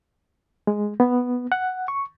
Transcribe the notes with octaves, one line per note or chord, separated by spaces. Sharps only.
G#3
B3
F#5
C#6